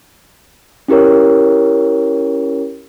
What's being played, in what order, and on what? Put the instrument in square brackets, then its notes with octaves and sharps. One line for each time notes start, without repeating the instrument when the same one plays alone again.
[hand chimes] C#4 E4 G4 A#4 C#5